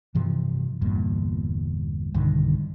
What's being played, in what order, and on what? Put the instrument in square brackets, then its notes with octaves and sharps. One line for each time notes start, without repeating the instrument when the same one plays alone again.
[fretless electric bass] G2 C3 E3 F3
G1 E2 G2 A#2
B1 G2 D3 D#3